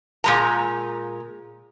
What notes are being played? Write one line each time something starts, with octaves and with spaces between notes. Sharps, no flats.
A#2 G#3 A#5